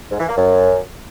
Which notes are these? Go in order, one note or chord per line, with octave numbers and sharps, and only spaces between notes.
G#2
E3
A#3
F#2